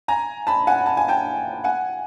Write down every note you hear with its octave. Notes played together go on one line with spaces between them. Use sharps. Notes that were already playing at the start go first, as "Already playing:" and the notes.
G#5 A#5
A5 B5
F#5 G#5
A5
G#5
G5 A5
F#5 G#5